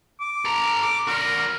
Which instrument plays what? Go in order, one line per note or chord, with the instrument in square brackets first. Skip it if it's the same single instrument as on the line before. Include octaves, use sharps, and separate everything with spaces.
[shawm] D6
[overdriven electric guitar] A4 A#5
[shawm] D6
[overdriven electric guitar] F#4 D5 [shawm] A#4